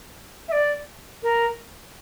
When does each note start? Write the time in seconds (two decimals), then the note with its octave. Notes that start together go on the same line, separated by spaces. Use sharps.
0.48 E5
0.52 D5
1.23 A#4